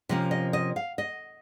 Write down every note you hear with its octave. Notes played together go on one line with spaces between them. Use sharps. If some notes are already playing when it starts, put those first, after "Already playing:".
C3 F3 A#3 C#4 D#5
D#5
D#5
F5
D#5